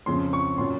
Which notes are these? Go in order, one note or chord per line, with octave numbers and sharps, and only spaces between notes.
F2 C#3 F3 C6
C#6
A#2 F#3 C#4 F4 C6